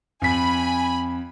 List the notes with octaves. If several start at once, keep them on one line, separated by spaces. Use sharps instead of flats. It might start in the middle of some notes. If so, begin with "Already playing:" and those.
F2 G#5 B5 B6